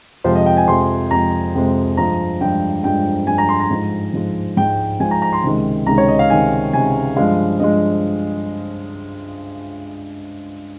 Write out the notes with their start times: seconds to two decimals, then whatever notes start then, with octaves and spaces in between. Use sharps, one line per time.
0.24 F2 C3 F3 G#3 C5
0.35 D#5
0.46 G5
0.57 G#5
0.67 F2 C3 F3 G#3 C6
1.11 F2 C3 F3 G#3 A#5
1.55 F2 C3 F3 G#3
1.97 G2 F3 G#3 A#5
2.41 G2 F3 G#3 G5
2.84 G2 F3 G#3 G5
3.27 G2 F3 G#3 G#5
3.38 A#5
3.49 C6
3.60 A#5
3.71 G#2 F3 G#3
4.14 G#2 F3 G#3
4.57 G#2 F3 G#3 G5
5.00 G#2 F3 G#3 G#5
5.11 A#5
5.22 A#5
5.33 C6
5.44 C#2 C3 D#3 G#3
5.87 C#2 C3 D#3 G#3 A#5
5.98 C#5
6.08 D#5
6.19 F5
6.29 C#2 C3 D#3 G#3 G#5
6.73 C#2 C3 D#3 G#3 G#5
7.16 G2 F3 G#3 F5
7.59 G2 F3 G#3 D#5